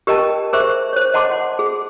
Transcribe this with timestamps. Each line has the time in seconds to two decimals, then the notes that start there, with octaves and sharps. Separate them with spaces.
0.07 G4 A#4 D#5 G5 A5
0.53 G#4 A#4 C5 E5 C#6
0.93 C5 C#5
1.14 D#5 F#5 A5 C6 D6
1.31 F#5
1.59 G#4